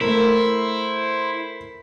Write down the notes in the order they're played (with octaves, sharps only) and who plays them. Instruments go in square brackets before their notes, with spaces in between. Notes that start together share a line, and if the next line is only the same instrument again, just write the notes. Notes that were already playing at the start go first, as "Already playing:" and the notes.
[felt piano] A3 A#4 [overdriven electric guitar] E4 [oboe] C5